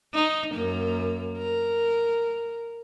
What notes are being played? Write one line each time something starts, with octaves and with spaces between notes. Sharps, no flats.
D#4
F#2 A#3
A#4